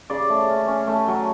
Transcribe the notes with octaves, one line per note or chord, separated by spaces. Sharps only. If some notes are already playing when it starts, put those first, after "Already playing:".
C#3 D5
A3
C#4
C#4
A3
F#3